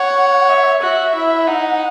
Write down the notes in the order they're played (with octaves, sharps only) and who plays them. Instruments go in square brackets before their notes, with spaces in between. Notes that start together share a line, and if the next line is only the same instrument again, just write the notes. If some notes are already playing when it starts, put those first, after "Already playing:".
Already playing: [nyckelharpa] C#5 [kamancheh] F#5
[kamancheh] E5
[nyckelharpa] F#4 [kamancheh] E5
[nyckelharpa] E4
[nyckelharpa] D#4 [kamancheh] F#5